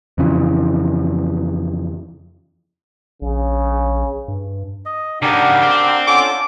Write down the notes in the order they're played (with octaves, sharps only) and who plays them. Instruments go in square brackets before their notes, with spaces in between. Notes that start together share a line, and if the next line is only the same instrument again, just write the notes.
[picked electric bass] F2 C#3 E3
[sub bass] A#1 [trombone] C#3
[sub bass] G2
[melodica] D#5
[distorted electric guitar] C#3 D#4 [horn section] D4 F#5 [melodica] G4 A#4 F5
[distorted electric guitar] C5 G5
[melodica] C#4 F4 A4 [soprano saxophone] D6